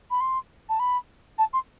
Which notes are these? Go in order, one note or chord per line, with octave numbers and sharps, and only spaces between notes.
B5
C6
A5
B5
A5
C6